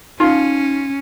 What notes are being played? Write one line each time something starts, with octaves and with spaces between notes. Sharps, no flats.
C#4 D#4 F4